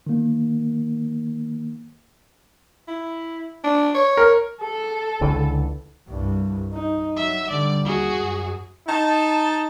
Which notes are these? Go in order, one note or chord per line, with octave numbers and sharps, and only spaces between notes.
D#3 A#3
E4
D4
C#5
A#4
A4
C#2 D3 E3
C2 G2
D#4
F#3 E5
D3 G3 D5
D#2 F#4 G#4
F#2
D#4 A5